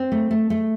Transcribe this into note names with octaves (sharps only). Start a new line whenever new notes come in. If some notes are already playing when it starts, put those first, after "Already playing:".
Already playing: C4
A3
A3
A3